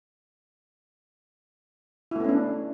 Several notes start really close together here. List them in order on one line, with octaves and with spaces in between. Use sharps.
E4 A3 B3 C#4 D4